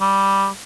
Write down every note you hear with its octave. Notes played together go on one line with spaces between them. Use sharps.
G3